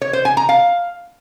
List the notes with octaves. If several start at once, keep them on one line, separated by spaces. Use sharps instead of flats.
C#5
C5
G#5
A#5
F5